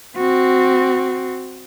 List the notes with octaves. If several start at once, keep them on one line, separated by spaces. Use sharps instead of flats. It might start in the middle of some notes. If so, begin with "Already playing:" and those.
C4 F#4